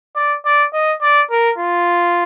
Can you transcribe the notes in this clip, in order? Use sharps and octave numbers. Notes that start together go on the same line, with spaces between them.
D5
D5
D#5
D5
A#4
F4